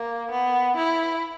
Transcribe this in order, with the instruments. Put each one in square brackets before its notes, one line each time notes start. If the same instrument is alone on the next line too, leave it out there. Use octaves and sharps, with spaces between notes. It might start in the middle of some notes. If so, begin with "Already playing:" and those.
Already playing: [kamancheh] A#3
B3
E4